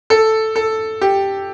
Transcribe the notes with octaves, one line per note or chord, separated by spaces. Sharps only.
A4
A4
G4